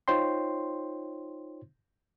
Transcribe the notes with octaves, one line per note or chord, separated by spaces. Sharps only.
D#4 F4 C5 C#5 G5 C6